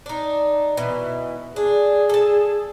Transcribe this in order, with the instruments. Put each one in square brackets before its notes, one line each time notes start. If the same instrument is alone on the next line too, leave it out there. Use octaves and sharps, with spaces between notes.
[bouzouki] D4 D#4
B2 E3
[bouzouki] D4 [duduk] G#4
[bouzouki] A4 A5